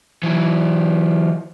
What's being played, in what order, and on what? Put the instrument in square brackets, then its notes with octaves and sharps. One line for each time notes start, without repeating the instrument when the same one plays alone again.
[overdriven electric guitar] E3 F#3